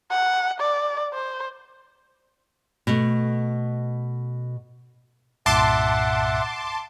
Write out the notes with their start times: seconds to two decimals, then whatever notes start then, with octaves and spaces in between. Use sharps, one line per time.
0.11 F#5
0.61 D5
1.14 C5
2.87 B2 A3
5.46 C2 G2 A#2 E5 F#5 A5 C6 D6